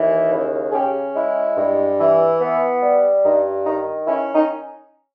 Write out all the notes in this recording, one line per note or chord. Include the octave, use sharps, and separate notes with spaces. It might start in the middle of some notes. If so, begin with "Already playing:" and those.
Already playing: D#2 E3
C#3 E4
G#4
C#4 G4
G#3 E4
G2
E3
B3
G3
G2 D#4
D#3 D#4
C#4 E4
D#4